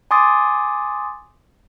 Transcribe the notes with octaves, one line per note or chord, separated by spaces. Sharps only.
G#5 C6 D6 D#6 A6